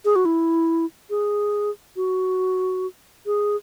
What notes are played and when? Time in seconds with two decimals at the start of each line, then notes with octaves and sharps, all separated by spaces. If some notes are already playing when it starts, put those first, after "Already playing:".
0.05 G#4
0.16 F#4
0.25 E4
1.10 G#4
1.96 F#4
3.26 G#4